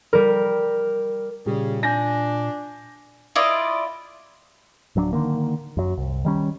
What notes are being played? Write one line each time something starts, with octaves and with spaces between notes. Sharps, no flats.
G3 A#4
A#2 C#3 G3
D4 G#5 G6 A#6
E4 F4 D5 D#5
D1 F#3 C#4 D4
D3 D#3 A#3
F#2 F#3
C2
D#3 G3 C#4